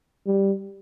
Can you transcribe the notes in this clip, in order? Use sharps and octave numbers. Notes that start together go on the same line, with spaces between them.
G3